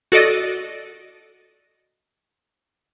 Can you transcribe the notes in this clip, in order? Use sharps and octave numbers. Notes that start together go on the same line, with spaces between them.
F#4 A4 D5 D#5